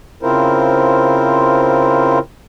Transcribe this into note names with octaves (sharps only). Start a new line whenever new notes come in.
C#3 C4 E4 F4 A#4 C5